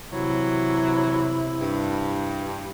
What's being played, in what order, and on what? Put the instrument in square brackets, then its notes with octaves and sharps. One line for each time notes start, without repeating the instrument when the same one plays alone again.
[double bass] C3 E4 [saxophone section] E3 F#3
[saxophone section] G2